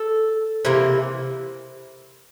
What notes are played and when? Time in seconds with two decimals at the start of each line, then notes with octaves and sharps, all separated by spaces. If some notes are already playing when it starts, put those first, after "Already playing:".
Already playing: A4
0.65 C3 E3 A#3